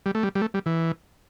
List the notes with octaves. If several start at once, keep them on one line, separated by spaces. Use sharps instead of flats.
G3
A3
G3
G3
A3
G3
E3